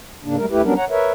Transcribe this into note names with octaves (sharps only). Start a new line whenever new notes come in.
G#2 C#3 A#3 D4
G3 A3 A#4
D2 A3 E4 G4 B4
F#3 G3 B3 C#4 D4 A#4
C#5 F#5 A#5
A#4 B4 C#5 E5